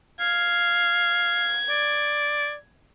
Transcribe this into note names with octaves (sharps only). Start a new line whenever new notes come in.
F5 G#6
D5